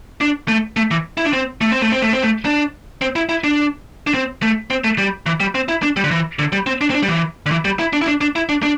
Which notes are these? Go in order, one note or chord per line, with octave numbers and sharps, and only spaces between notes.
D4
A3
A3
E3
E4
D4
C4
A3
C4
A3
C4
A3
C4
A3
D4
C4
E4
E4
D4
D4
C4
A3
C4
A3
G3
E3
G3
C4
E4
D4
G3
D3
E3
D3
G3
C4
D4
C4
D4
G3
E3
D3
E3
G3
E4
D4
E4
D4
D4
E4
D4
D4